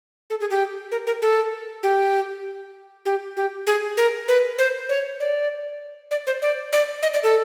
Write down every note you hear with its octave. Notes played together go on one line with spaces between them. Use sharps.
A4
G#4
G4
A#4
A#4
A4
G4
G4
G4
G#4
A#4
B4
C5
C#5
D5
D5
C5
D5
D5
D#5
D5
A4